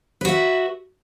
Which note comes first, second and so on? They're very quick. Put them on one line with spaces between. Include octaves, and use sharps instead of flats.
B4 F#4 E5